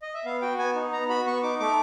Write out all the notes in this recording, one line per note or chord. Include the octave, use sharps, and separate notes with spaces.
D#5
E5
B3 F5
F#4 G5
B3 G#5
D#4
B3 A#5
F#4 B5
B3 C#6
D#4 D6
A3 D6